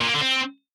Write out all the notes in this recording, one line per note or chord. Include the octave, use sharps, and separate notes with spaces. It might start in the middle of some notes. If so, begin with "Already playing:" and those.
A#2
A#3
D3
C4